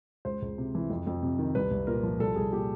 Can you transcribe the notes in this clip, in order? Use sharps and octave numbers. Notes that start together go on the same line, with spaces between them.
C#2 C5
C#2
C3
E3
F2
F2
C3
D#3
C2 B4
C2
A#2 A#4
F3
C2 A4
C2 G#4
A#2 G4